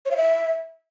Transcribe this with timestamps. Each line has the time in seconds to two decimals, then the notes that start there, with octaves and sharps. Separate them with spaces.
0.05 C#5
0.11 F5
0.16 E5